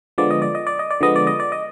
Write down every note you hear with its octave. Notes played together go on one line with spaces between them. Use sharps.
D3 F3 G#3 B3 D5
D#5
D5
D#5
D5
D#5
D5
D3 F3 G#3 B3 D#5
D5
D#5
D5
D#5